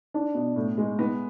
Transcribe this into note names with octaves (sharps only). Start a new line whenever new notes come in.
D4
B2
A2
G#3
B3